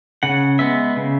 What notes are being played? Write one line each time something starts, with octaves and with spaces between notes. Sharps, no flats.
C#3 F#5
G#3 B3 E5
C#3